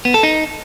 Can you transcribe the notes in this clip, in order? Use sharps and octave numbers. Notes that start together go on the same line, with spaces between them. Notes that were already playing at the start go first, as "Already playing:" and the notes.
B3
A4
D#4